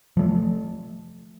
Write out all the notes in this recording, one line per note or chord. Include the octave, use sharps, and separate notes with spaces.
F3 A3